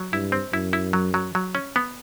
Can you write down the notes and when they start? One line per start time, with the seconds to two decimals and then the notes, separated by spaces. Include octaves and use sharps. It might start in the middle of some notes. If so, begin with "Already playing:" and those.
Already playing: F#3
0.12 G2 E4
0.32 C4
0.53 F#2 E4
0.73 E4
0.93 F#3
1.14 F#3
1.35 F#3
1.55 C#4
1.76 B3